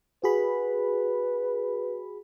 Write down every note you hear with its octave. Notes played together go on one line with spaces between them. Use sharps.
F#4 G#4 B4 B5